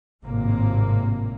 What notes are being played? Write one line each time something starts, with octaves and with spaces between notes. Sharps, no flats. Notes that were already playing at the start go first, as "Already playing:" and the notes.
G#1 A2 C3 A#3